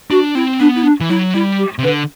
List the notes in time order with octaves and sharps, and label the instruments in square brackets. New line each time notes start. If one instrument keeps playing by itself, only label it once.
[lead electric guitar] D4 [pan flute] F#4
[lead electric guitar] C4 [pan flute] E4
[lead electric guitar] B3 [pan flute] D4
[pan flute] E4
D4
[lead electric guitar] E3
[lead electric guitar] F#3 [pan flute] E4
[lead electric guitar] G3 [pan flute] E4
[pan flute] G4
[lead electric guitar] C3
[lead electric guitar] D3 [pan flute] B4